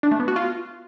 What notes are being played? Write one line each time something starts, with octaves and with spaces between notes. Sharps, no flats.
D4
A3
B3
F#4
F4